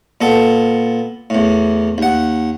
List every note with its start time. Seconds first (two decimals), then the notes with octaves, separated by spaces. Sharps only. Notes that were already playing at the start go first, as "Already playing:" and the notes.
0.21 A#2 B3 A4
1.30 E2 A2
1.98 D#2 F#5